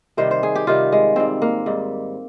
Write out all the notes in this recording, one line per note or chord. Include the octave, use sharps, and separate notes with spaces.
C3 D#3 G3 C5
C5
G#4
G4
C3 D#3 G3 F4
G#3
G#2 G3 C4
A#3
G#2 G3